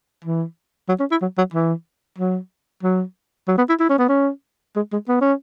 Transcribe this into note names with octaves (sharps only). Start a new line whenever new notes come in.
E3
F#3
C#4
E4
F#3
F#3
E3
F#3
F#3
F#3
B3
E4
E4
C#4
B3
C#4
G#3
G#3
B3
C#4